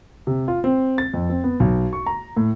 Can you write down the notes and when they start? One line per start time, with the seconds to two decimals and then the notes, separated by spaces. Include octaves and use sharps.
0.27 C3
0.48 F4
0.64 C4
0.98 A6
1.14 F2
1.29 C4
1.44 B3
1.60 B1
1.93 C#6
2.06 A#5
2.37 A2